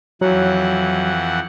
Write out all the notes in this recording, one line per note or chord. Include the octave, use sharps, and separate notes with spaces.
F2 E3 F#3 F#5